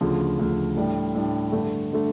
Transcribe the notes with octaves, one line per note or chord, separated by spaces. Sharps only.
D2 C#3 F3
D2 C#3 F3
A2 G3 D4
A2 G3 D4
G2 D3 A3
D3 A3